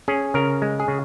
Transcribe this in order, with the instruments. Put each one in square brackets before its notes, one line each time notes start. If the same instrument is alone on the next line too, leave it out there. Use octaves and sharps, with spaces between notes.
[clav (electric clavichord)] C#4 G#4
C#3 A#4
G#3
G#4
C#3